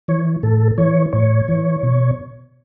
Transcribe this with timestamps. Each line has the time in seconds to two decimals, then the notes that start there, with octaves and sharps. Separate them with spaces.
0.08 E3 C#5
0.43 A2 A4
0.78 E3 C#5
1.13 A2 C#5
1.48 E3
1.83 B2